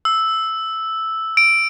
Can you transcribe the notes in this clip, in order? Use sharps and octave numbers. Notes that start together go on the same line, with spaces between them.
E6
D7